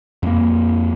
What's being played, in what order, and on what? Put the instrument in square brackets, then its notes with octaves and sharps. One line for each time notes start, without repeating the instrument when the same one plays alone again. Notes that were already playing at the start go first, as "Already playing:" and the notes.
[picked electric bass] F2 A#3